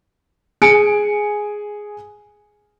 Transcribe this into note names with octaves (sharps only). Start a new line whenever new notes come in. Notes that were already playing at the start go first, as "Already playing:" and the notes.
G#4 G#5 C#7 D7